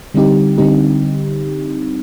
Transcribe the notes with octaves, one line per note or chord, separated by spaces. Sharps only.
D3 G3 C4 D#4 G4
D3 G3 C4 D#4 G4